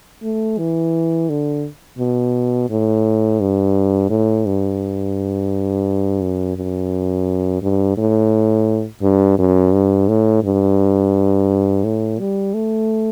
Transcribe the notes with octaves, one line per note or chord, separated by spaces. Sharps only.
A3
E3
D3
B2
A2
G2
A2
G2
F#2
F#2
G2
A2
G2
F#2
G2
A2
G2
A2
G3
A3